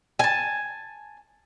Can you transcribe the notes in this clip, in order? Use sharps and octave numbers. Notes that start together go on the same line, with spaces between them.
G#5 A5